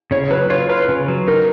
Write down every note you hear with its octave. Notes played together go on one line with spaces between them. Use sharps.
C#3 C#5
F#3 B4
F4 C#5
F4 B4
C#3
F#3
D#4 A#4